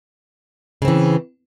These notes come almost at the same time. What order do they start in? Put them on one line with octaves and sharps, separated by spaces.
C#3 C4 E3